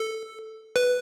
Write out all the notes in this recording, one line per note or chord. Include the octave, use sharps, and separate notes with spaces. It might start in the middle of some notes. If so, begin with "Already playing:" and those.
Already playing: A4
B4